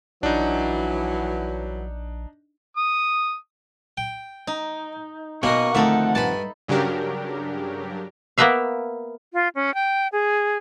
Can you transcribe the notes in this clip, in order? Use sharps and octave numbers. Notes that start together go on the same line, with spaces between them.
A#1 E3 F#3 D4 D#4
D#6
G5
D#4
B2 A#3 C#4 F#4 A#4 D#5 C#6
D2 D#3 F3 C4 D#4 A4 E5 F#5
G2 G#5 A5 B5
G2 C#3 F#3 D4 G4 A#4
A#3 B3 A#4 B4 E5 F5
F4
C#4
G5
G#4